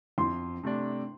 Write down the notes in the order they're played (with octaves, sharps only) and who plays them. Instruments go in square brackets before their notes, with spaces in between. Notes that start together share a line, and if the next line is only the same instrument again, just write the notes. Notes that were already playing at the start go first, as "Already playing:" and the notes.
[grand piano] F2 [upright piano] C6
[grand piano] C3 A3 D4